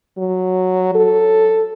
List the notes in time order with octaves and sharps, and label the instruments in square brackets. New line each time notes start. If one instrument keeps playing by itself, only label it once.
[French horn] F#3
A4